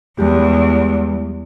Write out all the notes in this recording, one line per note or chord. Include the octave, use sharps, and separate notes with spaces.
E2 G3 G#3 G4